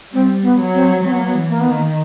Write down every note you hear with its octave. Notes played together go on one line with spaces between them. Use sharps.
G3 C4
B3
F#3
C4
F#3 C4
B3
A#3
B3
E3
A#3
D#3 B3
A#3